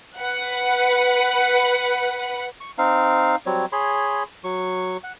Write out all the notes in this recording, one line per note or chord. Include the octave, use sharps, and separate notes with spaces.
B4 F#5
C#6
C4 D#4 F5
F#3 G3 C4 C#5
G#4 C#5 B5 C6
F#3 C#6
F#5